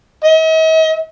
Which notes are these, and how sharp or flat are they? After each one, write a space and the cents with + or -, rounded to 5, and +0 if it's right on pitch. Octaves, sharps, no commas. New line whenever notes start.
D#5 +45